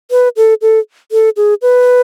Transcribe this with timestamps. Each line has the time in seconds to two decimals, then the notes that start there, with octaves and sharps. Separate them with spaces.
0.11 B4
0.37 A4
0.62 A4
1.12 A4
1.37 G#4
1.62 B4